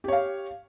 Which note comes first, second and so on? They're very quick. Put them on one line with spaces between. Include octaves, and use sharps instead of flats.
G4 C#5 F5